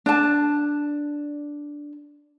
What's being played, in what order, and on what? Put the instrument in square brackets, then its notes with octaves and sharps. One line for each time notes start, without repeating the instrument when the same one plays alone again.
[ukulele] D4 A5